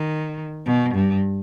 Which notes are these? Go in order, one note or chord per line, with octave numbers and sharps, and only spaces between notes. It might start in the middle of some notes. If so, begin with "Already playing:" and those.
Already playing: D#3
B2
G2